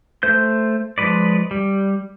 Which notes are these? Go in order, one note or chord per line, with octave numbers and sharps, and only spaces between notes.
A3 C5 G6
F3 G#3 B4 D5
G3